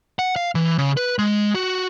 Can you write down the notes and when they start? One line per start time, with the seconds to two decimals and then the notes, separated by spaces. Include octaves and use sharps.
0.19 F#5
0.36 F5
0.55 E3
0.78 C#3
0.97 B4
1.19 G#3
1.55 F#4